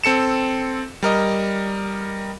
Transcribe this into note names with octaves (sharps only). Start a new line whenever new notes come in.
C4 A4 C#7 E7
G3 A#4 D#5